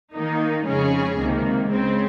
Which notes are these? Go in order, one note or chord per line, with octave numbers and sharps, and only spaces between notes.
D#3 A#3 D#4
F2 C#3 G#3 C#4 G#4
C#2 C3 D#3 A#3
C#3 G#3 C4